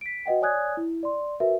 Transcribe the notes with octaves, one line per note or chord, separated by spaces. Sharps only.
B6 D7
F#4 B4 D#5 F#5 G5
C#5 D5 G#5 D#6 F#6 G#6
E4
D5 C6
F#4 A#4 B4 E5